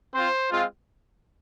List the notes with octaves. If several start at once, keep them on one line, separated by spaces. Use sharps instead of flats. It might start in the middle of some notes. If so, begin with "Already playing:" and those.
C4 F4 C5
G#3 C4 F4